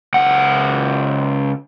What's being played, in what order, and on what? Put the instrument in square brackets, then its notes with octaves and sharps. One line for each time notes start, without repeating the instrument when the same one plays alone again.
[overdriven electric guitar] C#2 F#5